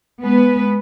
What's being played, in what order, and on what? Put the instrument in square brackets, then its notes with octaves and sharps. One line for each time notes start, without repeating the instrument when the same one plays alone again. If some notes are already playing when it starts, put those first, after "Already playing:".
[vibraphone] G#3 [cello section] B3 B4